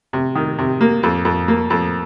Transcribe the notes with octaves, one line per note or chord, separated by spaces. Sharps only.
C3
D#3
C3
A#3
F2
F2
A#3
F2